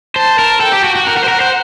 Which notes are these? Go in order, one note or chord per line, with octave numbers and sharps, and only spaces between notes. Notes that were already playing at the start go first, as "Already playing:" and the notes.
C5 A5
A#4
A4 G5
G4
F#4
F#4
A#4 F#5
A#4
C5
A#4
C5